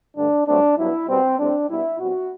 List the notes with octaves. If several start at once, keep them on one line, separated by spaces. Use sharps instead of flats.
G2 D3 A3 D4
G2 F#3 A3 C4 D4
G2 F#3 B3 E4
B2 G3 B3 C4
A2 G3 C4 D4
B2 G3 B3 E4
B2 G3 C4 F#4